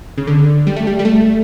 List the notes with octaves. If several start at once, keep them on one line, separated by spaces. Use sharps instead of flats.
C#3
D3
G3
A3
G3
G3
A3